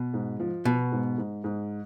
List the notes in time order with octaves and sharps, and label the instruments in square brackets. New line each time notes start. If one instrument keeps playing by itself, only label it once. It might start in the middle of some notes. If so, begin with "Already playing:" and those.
Already playing: [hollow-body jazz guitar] B2
[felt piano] G#2
F3
[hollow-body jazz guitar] B2 [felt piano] B3
[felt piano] G#2
G#2
G#2